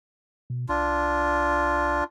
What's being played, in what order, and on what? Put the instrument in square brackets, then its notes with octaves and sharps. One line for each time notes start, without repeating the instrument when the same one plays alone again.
[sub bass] B2
[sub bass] C2 [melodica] D4 F4